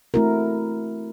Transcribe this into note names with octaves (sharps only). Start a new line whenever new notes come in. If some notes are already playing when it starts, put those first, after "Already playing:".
A3 C4 E4 F#4 A#4